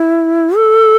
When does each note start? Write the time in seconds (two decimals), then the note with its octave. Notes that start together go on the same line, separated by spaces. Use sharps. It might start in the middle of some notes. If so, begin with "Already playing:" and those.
Already playing: E4
0.57 A4